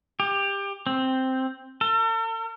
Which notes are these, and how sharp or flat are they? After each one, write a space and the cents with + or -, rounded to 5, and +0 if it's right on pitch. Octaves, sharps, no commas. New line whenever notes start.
G4 +20
C4 +0
A4 +45